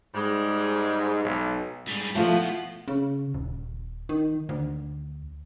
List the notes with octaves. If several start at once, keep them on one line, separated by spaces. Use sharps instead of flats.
G#2 G3 G#3
B1
G#2 G3
B2 F3 A3 F#5
C#3
D#1
D#3
D2